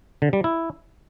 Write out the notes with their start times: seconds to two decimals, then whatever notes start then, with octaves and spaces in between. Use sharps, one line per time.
0.22 D3
0.33 G3
0.44 E4